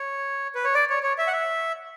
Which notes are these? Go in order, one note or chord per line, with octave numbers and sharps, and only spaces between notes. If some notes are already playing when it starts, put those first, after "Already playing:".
Already playing: C#5
B4
C#5
D5
C#5
C#5
E5
F#5
E5